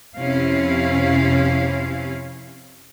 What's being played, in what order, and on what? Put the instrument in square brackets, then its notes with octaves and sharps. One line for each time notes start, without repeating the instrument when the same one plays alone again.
[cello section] F2 C3 C#4 E4 F5